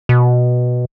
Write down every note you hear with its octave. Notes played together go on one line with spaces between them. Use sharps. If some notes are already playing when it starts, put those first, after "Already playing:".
B2